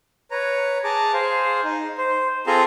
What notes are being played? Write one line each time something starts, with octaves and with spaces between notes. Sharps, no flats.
B4 C#5 A#5
G#4 A5 A#5 D6
G#4 C5 F5
D#4
C5
C4 F4 G#4 A4 A#5 C6